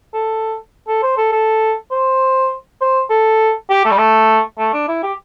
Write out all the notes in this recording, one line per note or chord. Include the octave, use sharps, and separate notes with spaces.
A4
A4
C5
A4
A4
C5
C5
A4
G4
A3
G3
A3
A3
D4
E4
G4